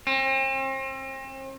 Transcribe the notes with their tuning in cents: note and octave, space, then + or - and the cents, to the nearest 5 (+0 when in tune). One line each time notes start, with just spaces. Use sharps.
C4 +40